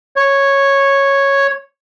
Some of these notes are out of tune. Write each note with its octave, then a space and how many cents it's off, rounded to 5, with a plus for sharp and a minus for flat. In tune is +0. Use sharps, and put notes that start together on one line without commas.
C#5 -5